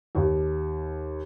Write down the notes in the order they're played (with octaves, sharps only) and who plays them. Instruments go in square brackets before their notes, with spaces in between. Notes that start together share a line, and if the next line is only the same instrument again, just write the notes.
[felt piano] D#2